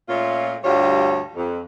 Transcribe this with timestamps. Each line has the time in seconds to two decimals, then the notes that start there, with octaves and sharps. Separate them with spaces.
0.09 A#2 A3 C#4 F4
0.64 D2 G2 G3 F4 C#5
1.36 F2